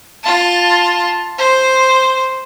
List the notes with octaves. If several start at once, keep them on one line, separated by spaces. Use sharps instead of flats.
F4 A5
C5